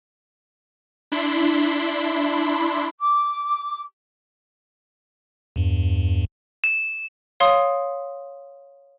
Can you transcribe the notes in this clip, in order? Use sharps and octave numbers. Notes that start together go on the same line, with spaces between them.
D4 E4 B5 C6
D6
E2 G2
E7
C#5 F5 C6 D#6